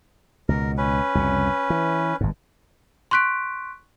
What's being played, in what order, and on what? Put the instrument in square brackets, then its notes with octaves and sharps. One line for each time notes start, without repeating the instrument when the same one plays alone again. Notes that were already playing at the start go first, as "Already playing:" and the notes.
[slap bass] C#2 B2 [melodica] A#4
[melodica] C#4 B4
[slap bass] C2 F2 C#3
E3
G#1 G2
[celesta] C6 C#6 F#6 B6 D7